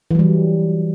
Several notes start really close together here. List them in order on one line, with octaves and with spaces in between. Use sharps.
E3 F#3 G3